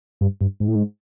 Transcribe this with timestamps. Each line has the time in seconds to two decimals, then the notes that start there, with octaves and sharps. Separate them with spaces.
0.21 G2
0.41 G2
0.60 G#2
0.68 A2
0.75 G#2